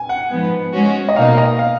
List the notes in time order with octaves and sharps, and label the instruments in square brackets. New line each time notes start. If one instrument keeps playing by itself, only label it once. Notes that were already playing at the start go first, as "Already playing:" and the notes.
Already playing: [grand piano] G#5
F#5
[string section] G#2 F3 B3
G#3 C#4 F#4
[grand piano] D#5
[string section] B2 A#3 D#4 [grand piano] F5
[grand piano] D#5
F5